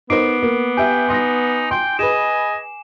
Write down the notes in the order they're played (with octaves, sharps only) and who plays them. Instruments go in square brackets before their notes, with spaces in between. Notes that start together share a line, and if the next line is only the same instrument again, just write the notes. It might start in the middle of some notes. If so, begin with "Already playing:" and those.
[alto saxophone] B3 [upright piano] D#4 A#4 C5 [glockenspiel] D6 C7 D7
[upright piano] A#3
[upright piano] G4 E5 [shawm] G5 [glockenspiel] G#5
[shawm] D#4 [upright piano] C6 D#6 A#6
[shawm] G5 [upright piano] C6
[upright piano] G#4 B4 [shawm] D#5 [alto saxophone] G#5 [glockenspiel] E7